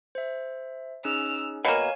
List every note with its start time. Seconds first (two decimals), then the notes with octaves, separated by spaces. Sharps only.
0.15 C5 E5
1.05 C#4 D#4 G#4 E6 F6
1.65 B2 A#3 C#5 F5 G#5 E7